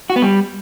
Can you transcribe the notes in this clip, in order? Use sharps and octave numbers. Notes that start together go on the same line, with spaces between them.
F#4
B3
G3